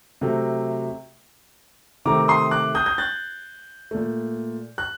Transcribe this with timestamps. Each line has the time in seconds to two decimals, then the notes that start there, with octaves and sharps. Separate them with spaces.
0.21 C3 F#3 A3
2.05 C3 D#3 A3 A#5 D6
2.28 C6 D#6
2.51 D6 F#6
2.75 D#6 G6
2.86 G6
2.98 F#6 A6
3.91 A#2 A3
4.78 F#6